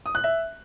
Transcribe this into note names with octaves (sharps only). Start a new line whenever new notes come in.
D#6
F#6
E5